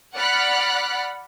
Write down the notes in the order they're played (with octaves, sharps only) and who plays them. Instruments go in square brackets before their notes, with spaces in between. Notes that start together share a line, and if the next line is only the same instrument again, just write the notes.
[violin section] D5 F#5 B5 F6 F#6